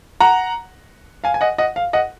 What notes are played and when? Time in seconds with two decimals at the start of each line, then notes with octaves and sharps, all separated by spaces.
0.20 F#5 A#5
1.24 F5 G#5
1.34 G#5
1.41 D#5 F#5
1.58 D#5 F#5
1.76 F5
1.93 D#5 F#5